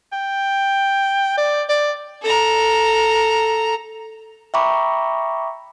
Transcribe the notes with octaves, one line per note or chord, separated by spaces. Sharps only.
G5
D5
D5
A4 A#5
E5 G5 A#5 B5 C#6 D6